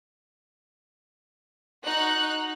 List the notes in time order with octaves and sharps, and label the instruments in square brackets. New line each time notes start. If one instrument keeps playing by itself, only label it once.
[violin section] D#4 F#4 F#6